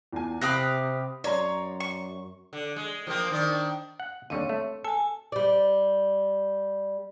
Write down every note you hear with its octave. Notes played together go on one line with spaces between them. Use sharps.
E2 F4 G#5
C3 G4 F5 B5 D#6 F#6 A#6
F#2 C#5 D5 A#5 C6
C#6
D3
G#3
F3 A#3 C4
D#3 D4
F#5
D#2 D3 G3 C4 C#5 C#6
A3
A4 G#5 A5
G3 D5